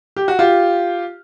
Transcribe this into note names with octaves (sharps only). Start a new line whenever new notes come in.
G4
F#4
F4 G4